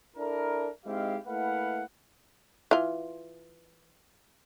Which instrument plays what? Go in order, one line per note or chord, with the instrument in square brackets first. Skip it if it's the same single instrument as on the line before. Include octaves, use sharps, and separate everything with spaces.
[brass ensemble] D4 E4 A4 A#4
G#3 C4 D#4 E4 G4 F5
A3 A#3 E4 B4 F5 F#5
[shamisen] E3 F4